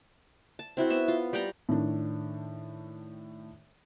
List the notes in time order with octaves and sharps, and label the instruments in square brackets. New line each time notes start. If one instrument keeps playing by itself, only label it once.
[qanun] A5
C4 E4 F#4
B3 E5
F4
G3 D5 G5 A#5
[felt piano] A2 D#3 D4